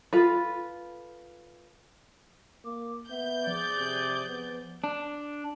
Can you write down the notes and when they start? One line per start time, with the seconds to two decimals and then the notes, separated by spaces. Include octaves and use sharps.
0.13 F4 A4 B4
2.64 A#3 D6
3.10 B3 E5 G6
3.47 F3 G#4 D5
3.77 C3
4.27 B3
4.84 D4